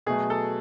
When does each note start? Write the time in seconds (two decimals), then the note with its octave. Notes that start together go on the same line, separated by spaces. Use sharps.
0.06 B2 F#3 A3 G#4
0.30 A4